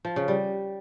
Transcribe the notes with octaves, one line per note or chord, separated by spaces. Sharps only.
F3
C#3
G3